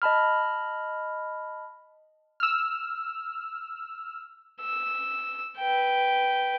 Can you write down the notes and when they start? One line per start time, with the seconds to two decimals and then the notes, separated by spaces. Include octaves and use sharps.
0.02 D#5 A5 B5 F6
2.40 E6 F6
4.61 E6
5.58 B4 G5